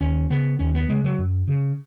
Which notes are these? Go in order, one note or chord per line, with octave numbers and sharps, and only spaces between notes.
D#2 C#4
C#3 B3
D#2 C#4
B3
C#3 G#3
F#3
F#2
C#3